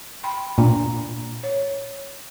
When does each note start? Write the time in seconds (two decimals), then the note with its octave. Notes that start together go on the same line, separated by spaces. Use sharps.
0.23 G5 B5 C6
0.58 A#2 D4 A#5
1.43 C#5